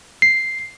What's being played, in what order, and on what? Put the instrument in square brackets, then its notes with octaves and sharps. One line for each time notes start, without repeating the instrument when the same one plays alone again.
[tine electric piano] C7